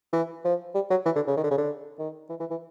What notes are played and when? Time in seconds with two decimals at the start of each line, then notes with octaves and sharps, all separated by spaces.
0.13 E3
0.45 F3
0.75 G3
0.90 F#3
1.06 E3
1.16 D3
1.27 C#3
1.37 D#3
1.44 D3
1.51 C#3
1.58 D3
1.99 D#3
2.30 E3
2.40 E3
2.51 E3